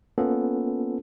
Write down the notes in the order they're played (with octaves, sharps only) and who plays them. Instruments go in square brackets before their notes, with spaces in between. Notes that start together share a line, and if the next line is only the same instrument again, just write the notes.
[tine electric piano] A#3 B3 C#4 F4 A4